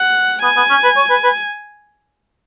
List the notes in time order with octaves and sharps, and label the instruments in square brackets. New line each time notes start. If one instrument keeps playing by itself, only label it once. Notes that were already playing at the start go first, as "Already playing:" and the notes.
Already playing: [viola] F#5
[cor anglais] B3 [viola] G#5
[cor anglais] B3
C#4
B4
C#5
B4
B4